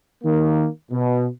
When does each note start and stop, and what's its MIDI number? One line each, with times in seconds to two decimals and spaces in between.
0.24 0.68 51
0.24 0.68 58
0.92 1.27 47